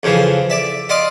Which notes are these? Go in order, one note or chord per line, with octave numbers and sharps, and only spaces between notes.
F2 C#3 E3 F3
D5 E5
D5 D#5 F5 C6 D6 D#6